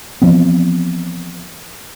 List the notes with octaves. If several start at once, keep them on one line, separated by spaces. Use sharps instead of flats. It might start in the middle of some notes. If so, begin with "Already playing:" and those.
E3 F3 B3 C4